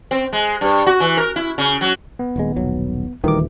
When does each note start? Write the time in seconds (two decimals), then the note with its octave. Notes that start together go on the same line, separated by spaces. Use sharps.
0.11 C4
0.33 G#3
0.61 G2
0.86 F#4
1.00 E3
1.17 A#4
1.36 E4
1.58 C#3
1.81 F#3
2.19 B3
2.36 D#1 D#2 G#3
2.56 D#1 B1 F#3
3.24 D#1 D2 D#3 E3 G3 D6